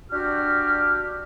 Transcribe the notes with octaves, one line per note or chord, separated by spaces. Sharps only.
D4 F#4 G4 F6